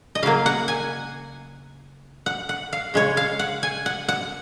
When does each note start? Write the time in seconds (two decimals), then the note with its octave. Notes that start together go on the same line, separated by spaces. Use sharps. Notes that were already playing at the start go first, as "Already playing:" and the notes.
0.15 D#5
0.23 C#3 F#3 A#3 F5
0.46 F#5
0.68 G#5
2.26 F#5
2.49 F#5
2.73 F5
2.94 C#3 G#3 C#5
3.17 F5
3.39 F#5
3.63 G#5
3.86 F#5
4.08 F#5